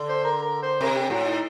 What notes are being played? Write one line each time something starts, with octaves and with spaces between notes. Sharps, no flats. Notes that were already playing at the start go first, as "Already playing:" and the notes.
Already playing: D3
C5
A#4
A#4
C5
C3 A#4
G4
A2 F#4
D#4